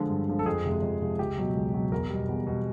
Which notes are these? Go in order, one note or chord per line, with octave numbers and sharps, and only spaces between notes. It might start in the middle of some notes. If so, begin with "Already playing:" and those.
Already playing: D3 F3 G#3
G2
D3 F3 G#3
A4
F2 G#4
C3 F3 G#3
F2
C3 F3 G#3
C#2 G4
B2 F#3
C#2
B2 F#3
E2 A#4
B2 G3
E2
B2 G3